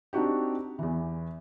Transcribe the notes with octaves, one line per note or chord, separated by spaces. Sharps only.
C4 D4 D#4 F#4 G4
E2 E3